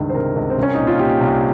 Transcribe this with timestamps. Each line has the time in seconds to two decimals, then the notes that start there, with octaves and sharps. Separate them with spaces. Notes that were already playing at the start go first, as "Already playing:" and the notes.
Already playing: C#2 G2 D#3
0.10 C5
0.15 C3 A#4
0.36 C#2
0.50 C4
0.58 C2 C#4
0.74 A#2 D#4
0.87 F4
0.99 A#2 G4
1.21 C2